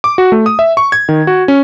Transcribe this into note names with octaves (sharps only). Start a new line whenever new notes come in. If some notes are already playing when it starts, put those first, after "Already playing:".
D6
F#4
A3
D#6
E5
C#6
G#6
D#3
F#4
C#4